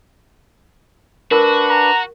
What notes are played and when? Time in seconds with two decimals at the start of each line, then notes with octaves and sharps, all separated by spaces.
1.31 D4 F#4 A#4 B4 E6
1.70 A#5